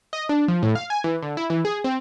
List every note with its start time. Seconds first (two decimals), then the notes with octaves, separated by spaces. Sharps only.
0.13 D#5
0.29 D4
0.48 F3
0.63 A2
0.75 F5
0.90 G#5
1.04 E3
1.23 D3
1.37 E4
1.50 E3
1.65 G#4
1.84 C4